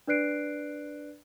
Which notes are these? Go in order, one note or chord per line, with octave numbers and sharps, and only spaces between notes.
D4 B4 D5 F#6 C7 D7